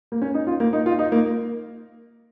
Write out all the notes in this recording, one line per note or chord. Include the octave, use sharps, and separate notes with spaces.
A#3
C#4
D#4
F4
A#3
D#4
F4
D#4
A#3